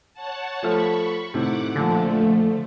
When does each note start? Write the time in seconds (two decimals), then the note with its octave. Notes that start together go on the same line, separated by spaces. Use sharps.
0.14 C#5 F#5 A5
0.63 F3 A3 B5 C#6 F6
1.34 A2 C3 D#3 F#5 D6
1.76 A#2 D3 F3 A3